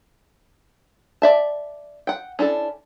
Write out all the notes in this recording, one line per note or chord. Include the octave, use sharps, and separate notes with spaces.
D5 E5 A5
F#5 G5
C#4 D4 E4 A4